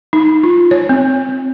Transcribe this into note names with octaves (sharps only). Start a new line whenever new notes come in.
D#4
F4
C#5
C4